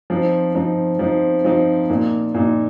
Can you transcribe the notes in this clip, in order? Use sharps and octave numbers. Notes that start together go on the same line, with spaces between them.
F3 C4 D#4
F3 C4 D#4
F3 C4 D#4
F3 C4 D#4
A#2 A#3 D#4
A#2 A#3 D#4